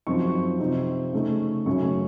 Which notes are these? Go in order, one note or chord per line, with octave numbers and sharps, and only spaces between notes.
F#2 F3 C4 D#4 C#6
C3 F3 C4 D#4
C#3 A3 D#4
F#2 C#3 A3 C#4 C#6